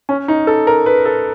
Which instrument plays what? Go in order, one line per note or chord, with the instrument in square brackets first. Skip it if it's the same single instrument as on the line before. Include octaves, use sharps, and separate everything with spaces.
[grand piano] C#4
D#4
A4
A#4
B4
A4